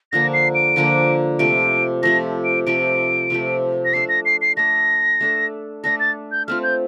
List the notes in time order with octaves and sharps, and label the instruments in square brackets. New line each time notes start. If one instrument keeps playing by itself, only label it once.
[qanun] D3 F3 A#3 D4 [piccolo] A#6
[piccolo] C7
D7
[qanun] D3 F3 A#3 D4
[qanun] C3 F3 A3 [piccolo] D7
[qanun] C3 F3 A3 [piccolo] A#6
[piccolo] D7
[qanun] C3 F3 A3 [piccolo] D7
[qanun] C3 F3 A3
[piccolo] A#6
[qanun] A3 D4 A4 [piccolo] C7
[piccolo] A#6
C7
C7
[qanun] A3 D4 A4 [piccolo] A#6
[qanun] A3 D4 A4
[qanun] A3 D4 A4 [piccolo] A#6
[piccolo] A6
G6
[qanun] A3 C4 F4 [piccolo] F6
[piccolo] G6